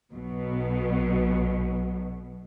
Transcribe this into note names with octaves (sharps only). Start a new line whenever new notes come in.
B1 B2 F#3